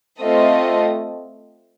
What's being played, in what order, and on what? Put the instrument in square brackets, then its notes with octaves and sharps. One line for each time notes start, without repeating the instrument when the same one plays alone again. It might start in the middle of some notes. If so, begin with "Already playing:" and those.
[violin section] A3 C4 F4 A4 D#5